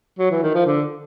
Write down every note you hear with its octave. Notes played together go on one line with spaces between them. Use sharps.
F#3
E3
D#3
F3
D3